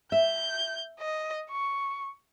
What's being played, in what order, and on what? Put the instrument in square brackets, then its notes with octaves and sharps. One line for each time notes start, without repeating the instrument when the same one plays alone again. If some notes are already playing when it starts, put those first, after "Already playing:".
[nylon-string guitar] E5 [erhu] G6
[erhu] D#5
C#6